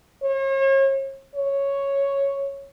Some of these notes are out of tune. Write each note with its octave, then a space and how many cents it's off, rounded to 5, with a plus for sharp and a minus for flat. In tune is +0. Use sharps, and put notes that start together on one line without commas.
C#5 -40
C#5 +0